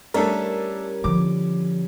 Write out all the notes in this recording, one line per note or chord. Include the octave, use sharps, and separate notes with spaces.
G3 A3 C#4 D4 E4 A4 A#4
D3 F3 D6